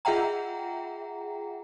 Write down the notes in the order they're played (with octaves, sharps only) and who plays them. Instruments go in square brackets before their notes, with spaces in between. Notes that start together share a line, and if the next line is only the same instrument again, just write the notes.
[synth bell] F4 G#4 E5 F#5 G5 A#5